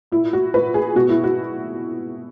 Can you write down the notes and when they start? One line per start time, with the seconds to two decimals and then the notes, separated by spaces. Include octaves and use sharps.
0.12 A#2 E4
0.33 F#4
0.54 A#2 B4
0.74 G#4
0.95 B2 F#4
1.09 E4
1.24 F#4